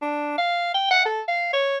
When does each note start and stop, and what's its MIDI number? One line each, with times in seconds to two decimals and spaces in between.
0.02 0.34 62
0.38 0.73 77
0.74 0.86 79
0.91 1.03 78
1.05 1.21 69
1.28 1.49 77
1.53 1.77 73